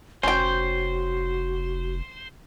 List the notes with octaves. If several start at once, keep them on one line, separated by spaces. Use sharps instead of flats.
F1 C#4 F#4 C5 G5